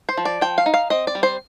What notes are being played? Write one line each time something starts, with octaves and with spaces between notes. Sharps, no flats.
C5
F3
D5
F3 G5
F5
D#4
F5
C4 D#5
D5
G3
C5